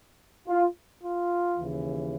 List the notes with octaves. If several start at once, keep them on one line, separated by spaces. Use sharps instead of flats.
F4
F4
D#2 C#3 E3